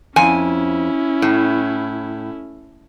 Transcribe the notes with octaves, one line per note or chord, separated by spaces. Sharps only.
F2 C#4 E4 G#5
A2